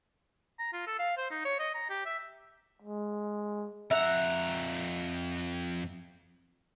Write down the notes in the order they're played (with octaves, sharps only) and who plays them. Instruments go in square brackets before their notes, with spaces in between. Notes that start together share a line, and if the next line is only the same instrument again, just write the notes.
[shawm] A#5
F4
A4
F5
C5
D#4
C#5
D#5
A#5
G4
E5
[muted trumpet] G#3
[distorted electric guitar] F2 A#5 [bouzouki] E5 F#5